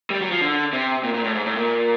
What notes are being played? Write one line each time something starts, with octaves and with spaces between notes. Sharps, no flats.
G3
F#3
F3
D3
C3
A#2
A#2
A2
G#2
A2
A#2